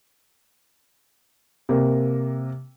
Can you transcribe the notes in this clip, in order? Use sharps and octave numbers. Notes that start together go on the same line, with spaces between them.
C3 A#3